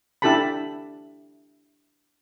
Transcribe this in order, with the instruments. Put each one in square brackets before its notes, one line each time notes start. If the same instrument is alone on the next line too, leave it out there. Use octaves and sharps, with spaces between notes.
[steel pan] D4 E4 G4 A4 A5 B5